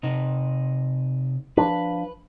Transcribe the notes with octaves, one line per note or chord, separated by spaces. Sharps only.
C3 D#4
F3 D4 B4